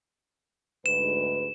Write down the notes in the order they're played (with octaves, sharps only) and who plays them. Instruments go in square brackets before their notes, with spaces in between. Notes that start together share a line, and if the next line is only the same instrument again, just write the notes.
[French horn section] D2 G#2 B4 [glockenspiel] E7